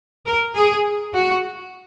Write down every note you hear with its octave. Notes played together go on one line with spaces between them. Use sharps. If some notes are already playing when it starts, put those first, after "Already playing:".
A#4
G#4
F#4